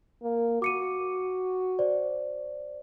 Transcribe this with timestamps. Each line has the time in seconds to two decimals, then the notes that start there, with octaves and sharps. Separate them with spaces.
0.23 A#3
0.62 F#4 D6 C#7 D#7
1.79 C5 D5